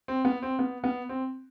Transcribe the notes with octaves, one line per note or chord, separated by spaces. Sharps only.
C4
B3
C4
B3
B3
C4